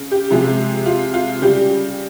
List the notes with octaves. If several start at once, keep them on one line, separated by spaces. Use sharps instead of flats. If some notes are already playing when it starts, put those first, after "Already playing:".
Already playing: C#3
G4
C3 F3 G#3
F4
F4
C#3 G3 G4